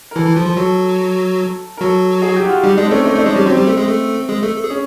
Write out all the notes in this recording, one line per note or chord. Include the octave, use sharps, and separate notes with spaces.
A#4
E3 E4 A4
E3 E4
F3 F4
F3 F4
F#3 F#4 A4
A#4
F#3 F#4 A4
G#4
G4
F#4
F4
G3 D#4 G4
G#3 D4 G#4
C4
A3 C#4 A4
A3 D#4 A4
A3 A4
D4
G#3 G#4
G3 C#4 G4
F#3 C4 F#4
G3 G4
A3 A4
G#3 G#4
A3 A4
G#3 G#4
A3 A4
A4
G#4
C#4